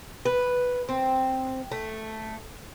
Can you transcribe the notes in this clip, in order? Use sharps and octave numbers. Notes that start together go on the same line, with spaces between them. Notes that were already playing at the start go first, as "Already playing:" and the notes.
B4
C4
A3